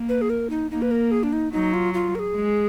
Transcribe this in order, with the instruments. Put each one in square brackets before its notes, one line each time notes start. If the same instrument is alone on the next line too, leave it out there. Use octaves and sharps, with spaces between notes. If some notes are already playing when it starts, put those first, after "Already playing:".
Already playing: [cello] A#3
[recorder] B4
G#4
A#4
D#4
[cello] A#3 [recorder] D#4
[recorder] B4
A#4
G#4
D4
D#4
[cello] F#3 [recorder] D#4
[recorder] F4
F4
A#4
G#4
[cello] G#3